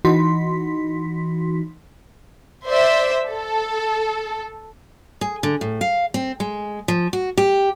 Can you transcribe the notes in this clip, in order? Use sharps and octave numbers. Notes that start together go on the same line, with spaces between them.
E3 D#4 F#4 C6 B6
C5 D5 E5
A4
G#4
D3
A2
F5
C4
G#3
F3
F#4
G4